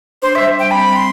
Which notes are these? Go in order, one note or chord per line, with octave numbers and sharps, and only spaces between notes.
D4 C5
G3 E5
C5 G5
C4 B5
G3
C6